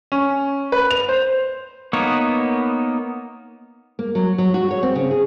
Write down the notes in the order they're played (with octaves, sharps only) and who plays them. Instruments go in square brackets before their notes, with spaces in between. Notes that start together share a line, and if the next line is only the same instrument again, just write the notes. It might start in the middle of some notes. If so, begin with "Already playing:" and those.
[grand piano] C#4
B4
F7
C5
[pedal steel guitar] A#3 B3 D#4 C#5
[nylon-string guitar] A#3
F#3
F#3
F#4
C#5
C4
C#3
G#4